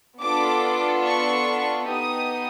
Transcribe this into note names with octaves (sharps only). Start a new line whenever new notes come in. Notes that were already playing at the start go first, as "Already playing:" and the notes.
B3 D4 F4 A4 D6
C#6
B3 D#4 G4 D#6